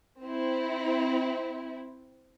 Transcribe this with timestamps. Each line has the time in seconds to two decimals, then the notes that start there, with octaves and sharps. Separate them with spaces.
0.22 C4 E4